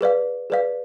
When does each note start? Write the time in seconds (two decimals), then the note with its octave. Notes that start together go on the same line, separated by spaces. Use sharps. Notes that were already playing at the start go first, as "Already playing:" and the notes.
0.01 G#4 B4 D5 F5
0.50 G#4 B4 D5 F5